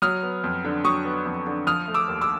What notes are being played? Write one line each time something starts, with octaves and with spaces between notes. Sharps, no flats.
F#3 D#6 F6
B3
F2
D3
F#3 C#6 D#6
B3
F2
D3
F3 D#6 F6
A3
D6 E6
D#2
D6 E6